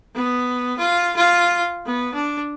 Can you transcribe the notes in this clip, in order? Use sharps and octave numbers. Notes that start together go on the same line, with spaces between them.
B3
F4
F4
B3
D4